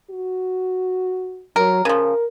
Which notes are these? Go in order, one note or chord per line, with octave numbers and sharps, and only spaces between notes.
F#4
F#3 A#4
C#3 F3 A#4